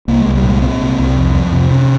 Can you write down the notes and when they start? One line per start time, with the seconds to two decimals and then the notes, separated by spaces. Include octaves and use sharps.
0.08 C2 A#3
0.21 C2 G#3
0.35 G3
0.43 A#2 G#3
0.61 A#2 C4
0.80 C2
0.99 C2
1.17 F2
1.35 F2
1.52 C3
1.71 C3 C#4